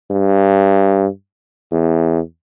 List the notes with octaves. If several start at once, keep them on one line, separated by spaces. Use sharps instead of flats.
G2
E2